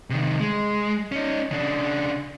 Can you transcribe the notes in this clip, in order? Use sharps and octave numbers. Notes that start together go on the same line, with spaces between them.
C3 D#3
G#3
C#4 D#4
C#3 D4